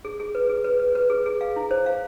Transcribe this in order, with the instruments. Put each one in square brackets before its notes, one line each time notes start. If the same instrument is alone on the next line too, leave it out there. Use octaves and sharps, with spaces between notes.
[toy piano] G#4
G#4
B4
G#4
B4
B4
B4
G#4
G#4
F5
E4
C5
F5